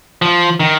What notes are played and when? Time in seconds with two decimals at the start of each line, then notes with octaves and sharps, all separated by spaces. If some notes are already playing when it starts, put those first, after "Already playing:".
0.22 F3
0.60 D#3